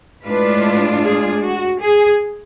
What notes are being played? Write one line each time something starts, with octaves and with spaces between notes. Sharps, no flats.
A2 G#3 D4 F4 B4
G#4
F#4
G#4